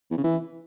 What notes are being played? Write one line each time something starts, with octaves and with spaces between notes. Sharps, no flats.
E2
C#3
E3